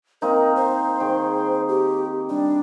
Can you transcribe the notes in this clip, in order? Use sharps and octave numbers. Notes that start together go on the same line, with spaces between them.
A#3 C4 D#4 A#4
C5
D#3 G#4 G5
G4
G3 D4